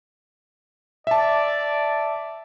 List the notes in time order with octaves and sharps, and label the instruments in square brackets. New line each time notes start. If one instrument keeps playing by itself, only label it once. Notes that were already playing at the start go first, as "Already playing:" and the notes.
[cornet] D5 [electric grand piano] E5 A5